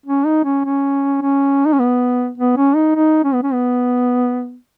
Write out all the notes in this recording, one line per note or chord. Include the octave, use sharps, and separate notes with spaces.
C#4
D#4
C#4
C#4
C#4
D#4
C#4
B3
B3
C#4
D#4
D#4
C#4
B3
C#4
B3